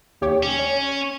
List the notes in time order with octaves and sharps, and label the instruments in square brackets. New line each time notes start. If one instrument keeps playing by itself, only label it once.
[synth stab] D#2 G4 C#5
[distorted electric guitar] C#4
[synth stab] C#5